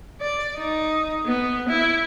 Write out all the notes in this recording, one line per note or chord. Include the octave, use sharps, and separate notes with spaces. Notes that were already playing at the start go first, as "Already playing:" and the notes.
D5
D#4
B3
E4